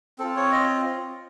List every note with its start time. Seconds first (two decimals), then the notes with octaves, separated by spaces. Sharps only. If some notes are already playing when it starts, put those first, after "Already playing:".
0.19 C4 F4 A4
0.36 C#5
0.52 D#5